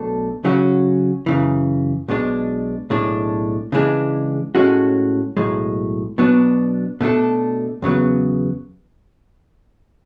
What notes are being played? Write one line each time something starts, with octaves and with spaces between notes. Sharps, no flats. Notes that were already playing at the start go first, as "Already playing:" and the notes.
Already playing: B1 B2 A3 D4 A4
C#3 F#3 C#4 F#4
F#2 C#3 E3
B1 B2 G#3 D4
B1 A2 G#3 D4
C#3 E3 G#3 D4 G#4
A2 G#3 C#4 F#4 A4
B1 A2 G#3
B2 F#3 B3 D4
B2 A3 D4 A4
E2 C#3 F#3 B3